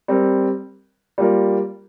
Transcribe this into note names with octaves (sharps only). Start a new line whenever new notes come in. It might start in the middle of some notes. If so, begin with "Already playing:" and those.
G3 C4 A#4
G3 A#3 F4 A#4